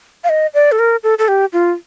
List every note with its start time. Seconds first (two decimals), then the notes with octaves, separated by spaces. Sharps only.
0.24 F5
0.29 D#5
0.54 D5
0.72 A4
0.79 A#4
1.03 A4
1.19 A4
1.28 G4
1.53 F4